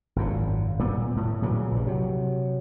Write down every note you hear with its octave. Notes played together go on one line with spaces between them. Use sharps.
G#1 F#2 A#2
A#2 G3 B3
A2
A#2 C#3 E3 F#3
A#1 G2
C3 F#3